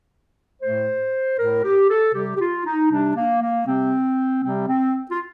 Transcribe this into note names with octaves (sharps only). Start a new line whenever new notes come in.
A2 A3 C5
A2 A3 A#4
G4
A4
C3 G3 G4
G4
F4
D#4
C3 G3 D4
A#3
A#3
C3 G3 C4
C3 G3 C4
C4
F4